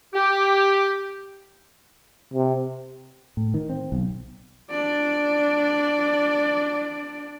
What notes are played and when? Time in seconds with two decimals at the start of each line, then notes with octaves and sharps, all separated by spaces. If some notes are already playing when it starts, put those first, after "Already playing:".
0.14 G4
2.34 C3
3.37 A2
3.54 D#3
3.69 C4
3.92 B1
4.70 D4 D5